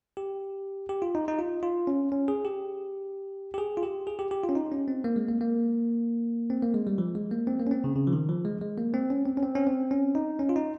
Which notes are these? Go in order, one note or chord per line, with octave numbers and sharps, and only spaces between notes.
G4
G4
F4
D#4
D#4
F4
F4
C#4
C#4
G#4
G4
G4
G#4
F4
G4
G#4
G4
G4
F4
C#4
D#4
C#4
C4
A#3
G#3
A#3
A#3
C4
A#3
G#3
G3
F3
G#3
A#3
C4
A#3
C#4
C4
C#3
C#3
F3
D#3
F3
G#3
G#3
A#3
C4
C#4
C4
C#4
C4
C#4
C4
C#4
D#4
C#4
F4
D#4